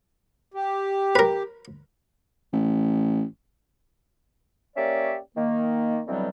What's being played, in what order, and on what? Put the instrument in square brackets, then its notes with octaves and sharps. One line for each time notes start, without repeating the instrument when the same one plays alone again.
[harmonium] G4
[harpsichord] A#4 B4
[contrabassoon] A1
[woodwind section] A#3 C#4 G4 C#5 D5 E5
D#3 A#3
B2 D3 E3 F#3 G3 C4